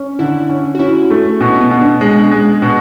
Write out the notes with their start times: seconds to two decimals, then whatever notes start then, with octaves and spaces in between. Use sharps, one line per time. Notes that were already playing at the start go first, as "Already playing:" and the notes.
Already playing: C#4
0.19 D3 E4
0.49 C#4
0.75 F#4
0.79 C#4 E4
1.10 A3
1.40 B2 C#4
1.60 B3
1.71 B2
1.81 D4
2.01 G#3
2.31 G#3
2.62 B2